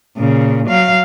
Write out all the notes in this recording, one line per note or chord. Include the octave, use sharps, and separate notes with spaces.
A#2 C#3
F#3 F5